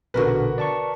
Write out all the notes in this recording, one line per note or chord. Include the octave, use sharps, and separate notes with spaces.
A#1 B2 D3 F#4 A#4 B4
D5 A5 C#6